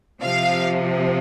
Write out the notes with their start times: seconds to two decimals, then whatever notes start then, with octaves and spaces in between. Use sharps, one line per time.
0.23 C3 F3 F5